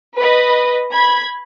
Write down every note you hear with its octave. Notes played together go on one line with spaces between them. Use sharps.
B4 D#5
B5 G#6